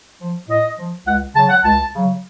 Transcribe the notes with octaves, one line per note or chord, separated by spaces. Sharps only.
F3
A2 D#5
F3
C#2 F#5
C#3 F#3 A5
F#5
C#2 A5
C#3 F#3